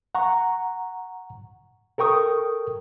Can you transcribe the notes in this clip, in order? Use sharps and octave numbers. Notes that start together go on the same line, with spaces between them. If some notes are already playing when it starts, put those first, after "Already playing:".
F#5 A#5 C#6
A4 A#4 G5 C#6 D#6